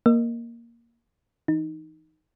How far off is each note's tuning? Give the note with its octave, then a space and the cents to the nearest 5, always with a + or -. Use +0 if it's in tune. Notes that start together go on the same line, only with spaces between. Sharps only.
A#3 +0 A#4 +0 D#5 +0
E3 +0 D#4 +0